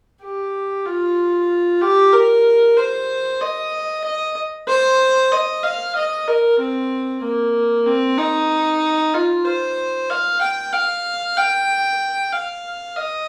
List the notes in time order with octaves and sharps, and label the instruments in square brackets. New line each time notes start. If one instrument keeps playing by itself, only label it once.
[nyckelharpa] G4
F4
G4
A#4
C5
D#5
D#5
C5
D#5
F5
D#5
A#4
C4
A#3
C4
D#4
F4
C5
F5
G5
F5
G5
F5
D#5